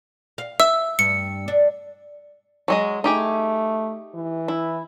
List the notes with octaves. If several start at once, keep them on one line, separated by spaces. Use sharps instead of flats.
F5
E5 E6
G2 C#7
D4
F#3 G#3 D#5
A3 D#4 G4 G#4
E3
E4